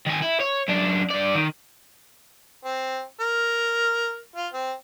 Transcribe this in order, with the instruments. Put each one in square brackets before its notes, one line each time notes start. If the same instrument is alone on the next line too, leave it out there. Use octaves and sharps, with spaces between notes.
[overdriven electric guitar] D#3 G#5
E4
C#5
F#2 D4
G2 D5
D#3
[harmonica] C4
A#4
F4
C4